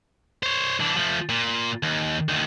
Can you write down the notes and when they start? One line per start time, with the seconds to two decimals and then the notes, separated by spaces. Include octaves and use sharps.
0.43 C5 C#5
0.80 E3 D4
0.96 F3 A3
1.29 A#2
1.83 D#2
2.29 D2 D#3